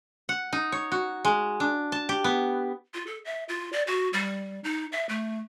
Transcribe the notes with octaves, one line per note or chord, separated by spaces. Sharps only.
F#5
D#4
C#5
F#4
G#3
D4
A5
G4
B3
F4
A4
E5
F4
D5
F#4
G3
D#4
E5
A3